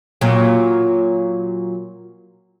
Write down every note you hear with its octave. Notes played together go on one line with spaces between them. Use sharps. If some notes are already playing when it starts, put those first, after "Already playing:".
A#2 F#3